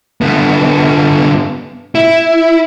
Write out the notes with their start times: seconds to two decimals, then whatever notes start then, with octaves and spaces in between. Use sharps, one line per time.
0.21 D3 B3
1.95 E4